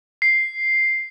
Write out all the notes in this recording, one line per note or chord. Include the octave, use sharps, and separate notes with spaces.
C7